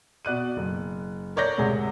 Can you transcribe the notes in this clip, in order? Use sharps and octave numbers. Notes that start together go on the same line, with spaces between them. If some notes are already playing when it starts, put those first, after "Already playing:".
B2 D5 F#6 D#7
F#1
A#4 C#5 D5 G6 A#6
D2 G#2 C3 G#4 C#5